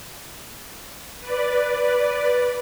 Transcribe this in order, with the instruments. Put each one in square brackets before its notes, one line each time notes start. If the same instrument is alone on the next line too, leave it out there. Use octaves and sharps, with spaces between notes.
[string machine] B4 D5